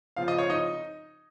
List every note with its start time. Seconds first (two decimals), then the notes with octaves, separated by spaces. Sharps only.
0.16 C#3 F3 C4 F4 F5
0.28 D#5
0.38 C#5
0.50 D#4 D#5